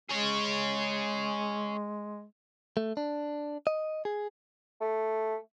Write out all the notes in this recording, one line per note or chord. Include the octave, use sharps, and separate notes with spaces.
G#3 G#4 C#5
A3
D4
D#5
G#4
A3